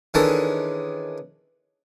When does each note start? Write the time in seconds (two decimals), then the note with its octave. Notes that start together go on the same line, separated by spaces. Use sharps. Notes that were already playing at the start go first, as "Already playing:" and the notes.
0.14 D#3 E3 G#3 C#4 D4 A4